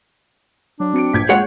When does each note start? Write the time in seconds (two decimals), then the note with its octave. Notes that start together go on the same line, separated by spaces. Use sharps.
0.80 F#3 D4
0.94 F#3 C4 C#7 D7
1.14 A#1 G6 G#6 B6
1.29 G#3 F4 G#4 C#5 F#5